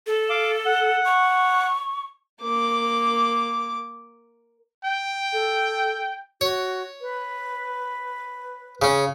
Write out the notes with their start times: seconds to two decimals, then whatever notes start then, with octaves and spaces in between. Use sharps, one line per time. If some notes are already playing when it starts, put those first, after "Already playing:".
0.07 A4
0.30 F5 D6
0.66 F#5
1.05 C#6
2.42 A#3 D6
4.85 G5
5.33 A4
6.41 F#4 C#5
7.01 B4
8.82 C#3 C#4